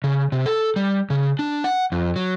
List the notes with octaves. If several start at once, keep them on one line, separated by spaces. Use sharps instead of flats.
C#3
C3
A4
G3
C#3
D4
F#5
F2
F#3